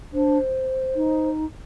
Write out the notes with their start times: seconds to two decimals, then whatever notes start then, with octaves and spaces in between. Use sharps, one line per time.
0.13 D4 C5
0.95 D#4